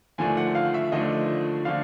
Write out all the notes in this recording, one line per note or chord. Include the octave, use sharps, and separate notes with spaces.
D#2 D3 F3 A3 D4 G#5
F#5
F5
E5
D#2 D3 F3 A3 D4 D#5
D3 F3 A3 D4 F5